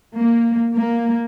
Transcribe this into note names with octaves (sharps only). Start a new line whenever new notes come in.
A#3
A#3